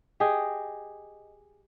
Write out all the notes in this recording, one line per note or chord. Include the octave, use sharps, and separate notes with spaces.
G4 G#4 D#5 G5